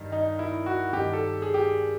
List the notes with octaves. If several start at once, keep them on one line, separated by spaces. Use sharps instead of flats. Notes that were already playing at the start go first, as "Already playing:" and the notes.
Already playing: G2 D#3
D#4
E4
F#4
G2 D#3 G4
A4
G#4
G4